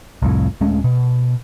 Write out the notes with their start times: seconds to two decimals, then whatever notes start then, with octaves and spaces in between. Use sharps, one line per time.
0.22 C2 F2 A2
0.61 D#1 G#3 A3 C#4
0.84 B2